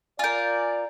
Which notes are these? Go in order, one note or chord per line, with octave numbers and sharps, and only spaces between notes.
F4 A#4 D5 G#5 G6